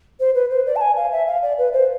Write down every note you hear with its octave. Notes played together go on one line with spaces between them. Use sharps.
C5
B4
C5
D5
A5
G#5
F5
E5
F5
D5
B4
C5